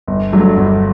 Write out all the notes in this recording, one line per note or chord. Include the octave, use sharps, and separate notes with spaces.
G1
G2 F#3 A3
G1